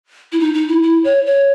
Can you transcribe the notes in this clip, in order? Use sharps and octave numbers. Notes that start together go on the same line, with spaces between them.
E4
D#4
D#4
E4
E4
C#5
C#5